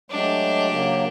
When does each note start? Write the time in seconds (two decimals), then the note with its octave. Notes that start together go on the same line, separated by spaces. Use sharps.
0.11 F#3 G#3 A3 D4 G4
0.69 C#3 F#3 A#3